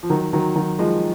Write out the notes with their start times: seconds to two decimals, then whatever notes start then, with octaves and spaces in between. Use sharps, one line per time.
0.03 F3
0.10 D#3 F#3
0.33 D#3 F#3
0.55 D#3 F#3
0.79 F3 G#3